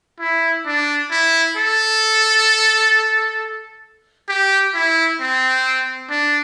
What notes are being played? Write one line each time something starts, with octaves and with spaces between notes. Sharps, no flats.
E4
D4
E4
A4
G4
E4
C4
D4